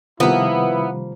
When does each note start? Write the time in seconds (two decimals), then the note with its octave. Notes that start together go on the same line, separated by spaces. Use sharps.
0.20 C3 D#3 F3 G3 A#3 B3 E4